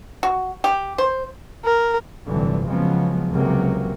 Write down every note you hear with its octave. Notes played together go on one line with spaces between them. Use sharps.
F#4
G4
C5
A#4
F1 G2 D3 E3 F#3
C#3 F3 F#3 G#3 B3
C#2 C3 F#3 A#3